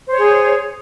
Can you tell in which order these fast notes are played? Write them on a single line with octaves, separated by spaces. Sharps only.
C5 C#5 G#4